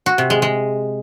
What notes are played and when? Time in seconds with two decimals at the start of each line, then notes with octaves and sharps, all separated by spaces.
0.06 F#4
0.18 C3
0.30 G#3
0.42 G#3